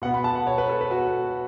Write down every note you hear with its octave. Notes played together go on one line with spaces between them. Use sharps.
B2 B3 F#5
B5
A5
F#5
C#5
B4
A4
B4
F#4